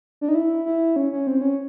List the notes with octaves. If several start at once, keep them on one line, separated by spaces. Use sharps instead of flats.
D4
D#4
E4
E4
C#4
C#4
C4
C#4